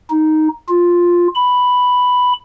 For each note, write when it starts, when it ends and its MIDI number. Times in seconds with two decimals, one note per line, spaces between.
0.10 0.49 63
0.69 1.28 65
1.35 2.33 83